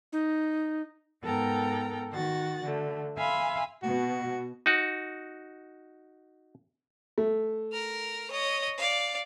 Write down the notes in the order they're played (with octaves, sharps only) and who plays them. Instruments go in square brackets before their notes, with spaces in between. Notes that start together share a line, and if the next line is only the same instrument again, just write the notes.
[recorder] D#4
[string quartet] G#2 B3 A4 A#4 G5 A#5
D#3 F#4 F#5 A6
D3 A3
E5 F5 G#5 B5 C6
[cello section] B2 [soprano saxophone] F#4
[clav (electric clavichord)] D#4 F#4
[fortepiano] A3
[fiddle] A#4 F6
C#5 D#5
D5 F5